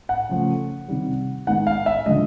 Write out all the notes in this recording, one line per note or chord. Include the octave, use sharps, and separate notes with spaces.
F#5
C#3 F3 A3
C3 D#3 G3
D#3 G#3 B3 F#5
F5
E5
D3 F3 G#3 D#5